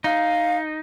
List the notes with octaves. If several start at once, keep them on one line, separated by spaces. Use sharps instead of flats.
D#4 F5